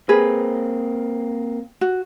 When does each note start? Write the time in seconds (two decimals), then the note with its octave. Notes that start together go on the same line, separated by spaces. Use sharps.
0.09 A#3 C4 G#4 B4
1.81 F#4